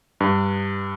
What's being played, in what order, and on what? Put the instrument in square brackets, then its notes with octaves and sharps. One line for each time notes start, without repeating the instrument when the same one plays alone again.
[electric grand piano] G2